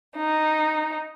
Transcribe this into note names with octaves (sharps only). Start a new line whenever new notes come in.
D#4